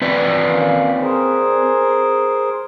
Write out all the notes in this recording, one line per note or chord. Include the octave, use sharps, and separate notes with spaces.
C4 B4 D5
D#3 A#3 C#4
G#4 A#4 C5